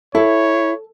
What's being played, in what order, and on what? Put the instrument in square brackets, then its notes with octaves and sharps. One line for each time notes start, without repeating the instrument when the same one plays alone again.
[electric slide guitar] E4 [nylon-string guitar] A4 [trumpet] C#5